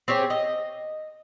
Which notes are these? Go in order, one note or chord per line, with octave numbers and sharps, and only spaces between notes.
C4 G4 G#4 C#5
D#5